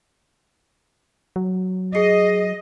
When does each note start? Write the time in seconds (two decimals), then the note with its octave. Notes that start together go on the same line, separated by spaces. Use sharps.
1.36 F#3
1.95 G#4 D#5 C7